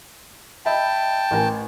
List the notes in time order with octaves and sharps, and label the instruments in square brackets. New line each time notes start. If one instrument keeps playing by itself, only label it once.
[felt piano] D#5 E5 B5 [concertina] G5 A5
[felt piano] A1 A#4 G#5